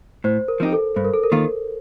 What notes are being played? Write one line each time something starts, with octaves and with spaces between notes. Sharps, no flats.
A2 C5
A#4
F3 C4 D#4 G4
A4
G2 C5
A#4
A4
A#4
D#3 A#3 F4